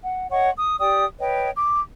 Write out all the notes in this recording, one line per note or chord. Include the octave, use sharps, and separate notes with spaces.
F#5
C#5 D#5 F#5 C#6
D#6
G4 D5 G5 D#6
B4 C#5 D#5 G5
D6